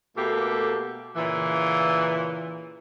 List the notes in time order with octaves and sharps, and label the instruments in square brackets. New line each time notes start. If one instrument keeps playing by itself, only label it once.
[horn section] B2 A3 A#3 G4 A4
A#2 C#3 E3